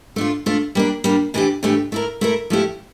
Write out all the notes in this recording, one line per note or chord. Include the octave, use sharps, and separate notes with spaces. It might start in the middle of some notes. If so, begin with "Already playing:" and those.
A3 D4 F4
A3 D4 F4
G3 A#3 D4
G3 A#3 D4
A2 E3 A3 D4 G4
A2 E3 A3 D4 G4
A3 E4 A#4
A3 E4 A#4
F3 A3 E4 G4